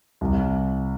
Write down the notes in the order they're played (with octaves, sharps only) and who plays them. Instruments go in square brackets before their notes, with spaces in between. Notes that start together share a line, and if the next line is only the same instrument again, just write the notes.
[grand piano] C2